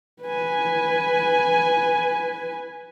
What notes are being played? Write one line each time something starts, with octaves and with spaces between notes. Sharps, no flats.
B4 G#5